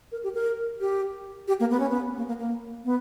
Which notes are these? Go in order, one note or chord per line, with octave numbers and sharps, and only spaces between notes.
A#4
G4
A#4
G4
G4
A#3
B3
C#4
B3
A#3
A#3
A#3
B3